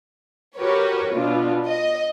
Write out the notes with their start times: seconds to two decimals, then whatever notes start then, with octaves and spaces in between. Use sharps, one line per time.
0.58 F#4 G4 A#4 B4 C#5
1.13 B2 D4 F4
1.67 D#5